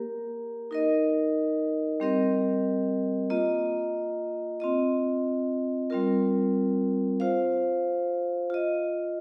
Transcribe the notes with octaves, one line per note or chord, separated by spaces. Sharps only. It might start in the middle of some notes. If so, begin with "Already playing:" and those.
Already playing: A#3 G4 A#4
D#4 A#4 D#5
G3 C4 G4 A#4 D#5
A#3 F4 D#5
C4 F4 D#5
G3 C4 F4 A#4
F4 C5 F5
F4 D#5